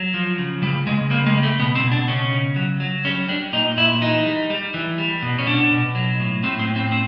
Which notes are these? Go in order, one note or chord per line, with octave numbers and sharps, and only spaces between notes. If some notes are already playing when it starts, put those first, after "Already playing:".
Already playing: F#3
F3
C#3
C#3 G3
C#3 G#3
G3 A#3
G#3
G3
A3
B2 B3
C4
B2
D4
C#3 C#4
C#3
F#3
F#3
G3 C#4
G3 D4
A#2 D#4
A#2 E4
E3 D#4
G3
G3
E3
G3
B2
C#4
B2 D4
B2
F#3
A2
A2 C4
C4
A2
C4
C4